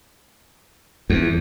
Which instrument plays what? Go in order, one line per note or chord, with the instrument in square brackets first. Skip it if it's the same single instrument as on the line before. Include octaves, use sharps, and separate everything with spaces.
[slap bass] E2